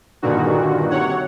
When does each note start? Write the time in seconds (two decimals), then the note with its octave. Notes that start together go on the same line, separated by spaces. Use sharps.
0.22 G2 A#2 D3 D#3 F#4
0.90 C3 C#5 F#5